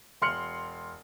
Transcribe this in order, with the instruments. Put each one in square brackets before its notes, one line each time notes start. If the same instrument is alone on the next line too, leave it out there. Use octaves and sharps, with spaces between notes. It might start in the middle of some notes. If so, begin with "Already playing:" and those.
[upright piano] E1 C6 F6 C#7 F#7